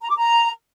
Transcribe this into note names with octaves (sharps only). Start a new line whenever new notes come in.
A#5
D6
A#5